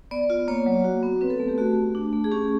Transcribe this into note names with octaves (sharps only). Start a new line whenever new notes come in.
B3 D5
F4
A#3 C#5
F#3
F#4
B3
C4 B4
A4
A3
G4
A3 F#4
A3
D4
A3
G#4
C#4 G4